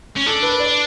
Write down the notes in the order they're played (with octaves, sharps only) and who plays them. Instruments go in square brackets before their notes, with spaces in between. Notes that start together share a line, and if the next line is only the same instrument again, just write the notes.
[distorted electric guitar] C#4
[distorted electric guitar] D4 [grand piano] A4
[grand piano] B4
D5